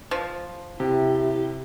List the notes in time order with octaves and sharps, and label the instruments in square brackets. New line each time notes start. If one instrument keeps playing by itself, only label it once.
[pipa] F3
[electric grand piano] C3 [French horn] E4 [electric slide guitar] G4